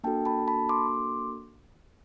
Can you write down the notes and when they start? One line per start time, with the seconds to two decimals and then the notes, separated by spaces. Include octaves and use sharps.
0.04 A#3 D4 F#4 A4 G5 A5
0.25 A5 B5
0.48 A5 B5
0.69 C6 D6